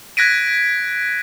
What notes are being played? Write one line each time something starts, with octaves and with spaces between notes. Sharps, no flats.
F#6 G#6 A#6 B6 D7 D#7